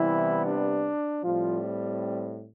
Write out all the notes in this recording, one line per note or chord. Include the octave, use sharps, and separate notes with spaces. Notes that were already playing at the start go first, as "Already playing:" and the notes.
Already playing: C3 E3 G3 B3 E4
D4
A2 F3 G3 C4 F4